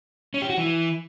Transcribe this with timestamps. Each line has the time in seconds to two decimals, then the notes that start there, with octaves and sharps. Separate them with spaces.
0.34 C#4
0.42 G4
0.50 F#4
0.58 E3